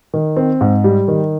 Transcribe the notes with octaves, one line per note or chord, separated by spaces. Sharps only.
D#3
C4
G#2
G3
D#3